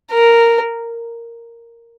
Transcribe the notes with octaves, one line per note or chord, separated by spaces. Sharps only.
A#4